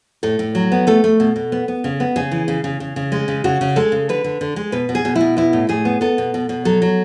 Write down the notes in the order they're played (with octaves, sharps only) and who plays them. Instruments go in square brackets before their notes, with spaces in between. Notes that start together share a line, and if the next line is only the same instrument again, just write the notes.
[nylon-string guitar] A2 A4
A2
F#3
B3
A3 A4
A3
B2
B2
B3
B3
C#3
B3
C#3 G#4
E3
C#3
C#3
C#3
C#3
G#3
C#3
C#3 F#4
C#3
G#3 A4
C#3
D3 B4
D3
D3
G#3
B2 B4
B2
G#4
B2
E4
B2
B3 E4
A2
A2 G#4
B3
B3 A4
B2
B2
B2
F#3 A4
F#3